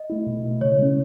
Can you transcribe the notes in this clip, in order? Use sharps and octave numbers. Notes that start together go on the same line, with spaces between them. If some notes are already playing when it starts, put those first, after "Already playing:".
Already playing: D#5
A3 E4
B2
A3 E4
C#3 C#5
G#3 C#4